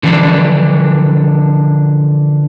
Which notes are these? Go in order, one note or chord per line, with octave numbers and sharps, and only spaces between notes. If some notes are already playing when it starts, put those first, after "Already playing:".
D3 E3 F3 D4